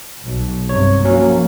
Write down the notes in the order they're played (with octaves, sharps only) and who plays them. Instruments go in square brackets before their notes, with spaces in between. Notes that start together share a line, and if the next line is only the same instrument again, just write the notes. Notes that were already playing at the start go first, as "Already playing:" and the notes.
[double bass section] B1
[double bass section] G2 C3 [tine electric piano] C#5
[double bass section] F3 A#3 [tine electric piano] F#3 C#4